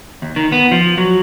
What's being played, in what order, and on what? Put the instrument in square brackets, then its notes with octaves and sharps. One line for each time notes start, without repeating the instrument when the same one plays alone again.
[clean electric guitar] D#2
D#3
B3
F3
F#3